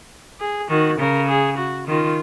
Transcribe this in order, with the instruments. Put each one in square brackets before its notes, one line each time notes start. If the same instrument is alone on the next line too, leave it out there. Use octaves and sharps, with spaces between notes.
[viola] G#4
[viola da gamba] D#3 [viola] F#4
[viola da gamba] C#3 [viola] A#4
[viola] G#4
F#4
[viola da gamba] D#3 [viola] F4